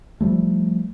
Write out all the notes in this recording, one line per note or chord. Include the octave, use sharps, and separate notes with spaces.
F3 G3 A3